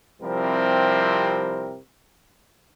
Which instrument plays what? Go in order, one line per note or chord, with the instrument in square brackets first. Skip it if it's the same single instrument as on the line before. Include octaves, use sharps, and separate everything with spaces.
[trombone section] C3 F3 G3 C4 E4 A#4